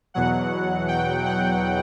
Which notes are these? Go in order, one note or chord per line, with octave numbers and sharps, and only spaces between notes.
E2 B2 F#3 F#5
G5
F#5